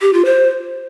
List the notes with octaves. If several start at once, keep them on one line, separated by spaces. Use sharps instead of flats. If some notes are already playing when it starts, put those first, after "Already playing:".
G4
F4
C5